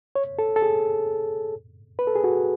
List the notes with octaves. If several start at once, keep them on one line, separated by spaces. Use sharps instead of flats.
C#5
A4
A4
G#4
B4
A4
G#4
F#4